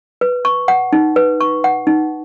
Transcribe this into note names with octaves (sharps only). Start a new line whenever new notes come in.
B4
C#6
F#5
D#4
B4
C#6
F#5
D#4